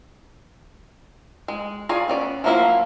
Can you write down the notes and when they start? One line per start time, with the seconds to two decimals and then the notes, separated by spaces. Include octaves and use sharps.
1.48 G#3
1.89 F4 G#4 C#5 D5
2.08 B3 C#4 D5
2.44 F3 F#3 A#3 E4 F4